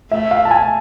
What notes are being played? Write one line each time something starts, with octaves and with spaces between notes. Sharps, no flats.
A3 E5
F5
A5
G#5